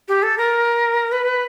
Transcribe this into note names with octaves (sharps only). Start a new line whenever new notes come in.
G4
A4
A#4
B4